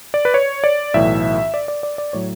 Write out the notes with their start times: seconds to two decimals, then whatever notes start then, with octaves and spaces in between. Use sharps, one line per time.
0.14 D5
0.25 B4
0.34 C#5
0.64 D5
0.94 B1 A2 E3 E5
1.54 D5
1.68 D5
1.83 D5
1.98 D5
2.13 A2 F#3 C#5